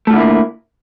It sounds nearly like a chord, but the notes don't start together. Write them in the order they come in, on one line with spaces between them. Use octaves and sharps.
A3 F4 D3 E4 A#3